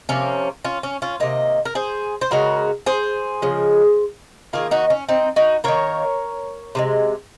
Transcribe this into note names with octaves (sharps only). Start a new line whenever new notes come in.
C3 F3 A#3 C#4
C#4 F4
C#4
C#4 F4
C3 D#3 A#3 D#5
A#4
G#4 C5
C5
C#3 G#3 F#4 A#4
G#4 C5
C#3 F3 G#3
D#3 A#3 F4 G#4
D#4 F#4
C#4
C4 D#4
D#4 F#4
D#3 A#3 A#4 C#5
C3 F3 G#3